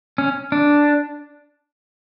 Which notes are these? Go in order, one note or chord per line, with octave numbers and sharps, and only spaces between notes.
C#4
D4